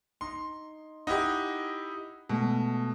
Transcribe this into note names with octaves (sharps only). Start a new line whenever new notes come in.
D#4 C6
D#4 E4 G4 F#5
B2 G#3 A3